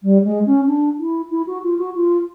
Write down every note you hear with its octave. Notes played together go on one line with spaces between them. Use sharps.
G3
G#3
C#4
D4
E4
E4
F#4
F4
F#4
F4